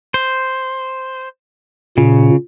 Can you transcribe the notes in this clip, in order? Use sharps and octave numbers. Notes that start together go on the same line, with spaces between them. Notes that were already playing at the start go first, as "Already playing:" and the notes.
C5
A#2 C#3